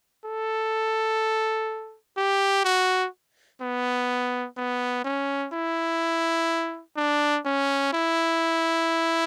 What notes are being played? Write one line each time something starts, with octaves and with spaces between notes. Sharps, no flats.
A4
G4
F#4
B3
B3
C#4
E4
D4
C#4
E4